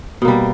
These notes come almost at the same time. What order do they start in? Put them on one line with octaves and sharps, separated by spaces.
B2 A#3 G3